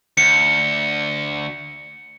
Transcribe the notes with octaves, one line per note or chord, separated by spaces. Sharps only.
D2 C#7